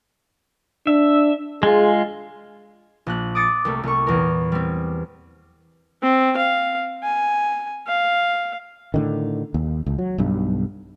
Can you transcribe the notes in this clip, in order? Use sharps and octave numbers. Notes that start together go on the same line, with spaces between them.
D4 E5
G#3 F4 G#4
A#1 F#6
D6 D#6 A6 C#7 D7
C2 A3 A#3
C2 C#6
E2 A#2 A#4
G3 C4
C4
F5
G#5
F5
A2 D3 D#3
D#2
C#2
F#3
B1 G2